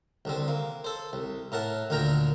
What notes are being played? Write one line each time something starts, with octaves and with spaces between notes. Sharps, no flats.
C2 D3 C4
A#3
A4 C5
C2
A2 A#4 F#5 A5
D2 A#2 D3 A#4 G5 A#5